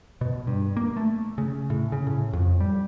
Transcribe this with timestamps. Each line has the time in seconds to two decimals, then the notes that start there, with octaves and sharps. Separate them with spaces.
0.21 B2
0.47 G2
0.77 A#3
0.97 A3
1.38 C#3
1.70 A2
1.92 C#3
2.07 A2
2.33 F2
2.60 G3